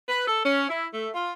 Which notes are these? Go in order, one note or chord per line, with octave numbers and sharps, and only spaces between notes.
B4
A4
C#4
E4
A3
F4